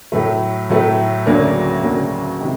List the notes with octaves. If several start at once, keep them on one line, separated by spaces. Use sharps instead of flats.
A2 F#3 A3
A2 F#3 A3
D2 C#3 F#3 A#3 D4
D2 C#3 F#3 A#3 D4
C3 D#3 G#3